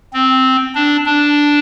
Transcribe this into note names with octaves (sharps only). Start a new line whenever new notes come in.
C4
D4
D4